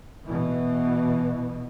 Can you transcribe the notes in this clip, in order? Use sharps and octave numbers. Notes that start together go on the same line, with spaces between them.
B2 E3